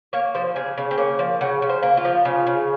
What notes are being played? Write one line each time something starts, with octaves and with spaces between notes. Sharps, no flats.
A#3 C#5
F3 C5
C#3 G#4
C#3
C4
A#3 C#4
F3
C#3 F#4
C#3
C5
A#3
F4
F3
C#3
C#3